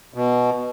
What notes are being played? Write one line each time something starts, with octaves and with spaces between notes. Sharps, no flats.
B2